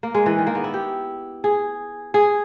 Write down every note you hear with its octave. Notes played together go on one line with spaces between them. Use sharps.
A#3
G#3
E3
D#3
A#3
B3
E4
G4
G#4
G#4